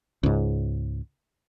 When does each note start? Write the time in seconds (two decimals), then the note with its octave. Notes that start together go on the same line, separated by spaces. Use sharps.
0.23 C#2 G#2